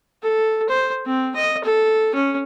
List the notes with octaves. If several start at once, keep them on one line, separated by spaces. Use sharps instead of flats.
A4
C5
C4
D#5
A4
C#4